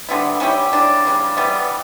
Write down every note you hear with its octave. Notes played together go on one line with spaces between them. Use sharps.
D3 G3 B3 E4
G3 C#4 E4 G4
C#3 G3 D4
C#3 G3 D4
E3 G3 B3